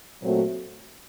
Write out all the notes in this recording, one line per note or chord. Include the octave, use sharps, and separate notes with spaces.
A#2 F#3 A3 C4 F#4